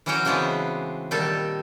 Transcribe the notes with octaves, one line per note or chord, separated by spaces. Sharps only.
E3 F#3 C#4 F#4 C#5 G5
C#3 E3 G#3 B3 C4 D4
A#2 D#3 G3 G4 A4